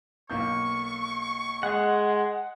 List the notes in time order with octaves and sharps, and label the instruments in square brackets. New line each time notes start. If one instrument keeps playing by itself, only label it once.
[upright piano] B1 A#3 G6 [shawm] C#6
[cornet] G#3 [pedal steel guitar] F#5